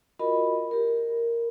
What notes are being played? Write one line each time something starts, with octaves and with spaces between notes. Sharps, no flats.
F4 F#4 A#4 D#5 B5
G4 A#4